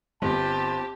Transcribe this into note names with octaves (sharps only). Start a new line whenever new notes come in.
G1 C4 F4 G4 D#5 A5